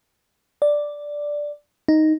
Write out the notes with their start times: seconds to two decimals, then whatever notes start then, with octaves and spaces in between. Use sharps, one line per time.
0.62 D5
1.88 D#4